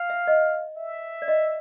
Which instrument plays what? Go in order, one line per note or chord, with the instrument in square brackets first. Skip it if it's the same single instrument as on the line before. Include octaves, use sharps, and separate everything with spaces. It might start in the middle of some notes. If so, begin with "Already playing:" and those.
Already playing: [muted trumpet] F5
[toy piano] E5
D#5
[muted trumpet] E5
[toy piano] D5
D#5